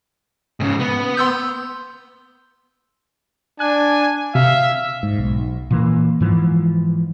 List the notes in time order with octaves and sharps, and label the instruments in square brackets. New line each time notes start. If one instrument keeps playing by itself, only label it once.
[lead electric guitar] G#2 C#3
B3
[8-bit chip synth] C6 E6 G6
[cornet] D4 [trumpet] G#5 [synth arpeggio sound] F#6
[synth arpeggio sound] C3 [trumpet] E5 [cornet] F5
[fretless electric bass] G#2
B1
A#2 E3 A#3
G#2 E3 F3